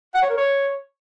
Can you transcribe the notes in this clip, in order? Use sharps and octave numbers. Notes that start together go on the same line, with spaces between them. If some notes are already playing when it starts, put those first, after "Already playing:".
F#5
C#5
A#4
C#5